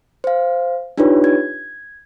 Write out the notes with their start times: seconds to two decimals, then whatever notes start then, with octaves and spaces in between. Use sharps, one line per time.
0.24 C5 F5
0.98 D4 D#4 F4 G4 B4 C#5
1.24 G#6